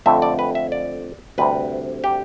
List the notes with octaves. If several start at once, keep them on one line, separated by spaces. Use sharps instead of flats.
F2 D3 A3 C4 E5
D5
B4
E5
D5
D2 C3 G3 C4 B4
G4